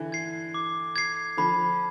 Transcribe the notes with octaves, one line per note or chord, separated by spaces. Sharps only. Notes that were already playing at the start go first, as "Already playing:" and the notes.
Already playing: D3 E3
G#6 C7
D6
G#6 C7
D3 F3 B5